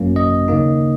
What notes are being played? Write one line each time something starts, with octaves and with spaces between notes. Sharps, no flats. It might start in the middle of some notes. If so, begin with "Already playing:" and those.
Already playing: G#1 F#2 F#3 A#3 C#4
D#5
D#2 C#3 A#3 D#4